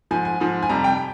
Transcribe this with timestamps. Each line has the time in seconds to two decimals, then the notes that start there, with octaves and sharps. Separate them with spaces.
0.11 G#2 F3 G#5
0.25 G#5
0.40 G#2 F3
0.63 G#5
0.69 F2 C3 G3 A#5
0.84 G5